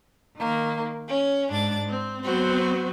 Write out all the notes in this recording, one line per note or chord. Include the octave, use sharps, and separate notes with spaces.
D#3 A#3
C#4
G#2 D4 A6
C4
F#3 B3 C4 F#4 C5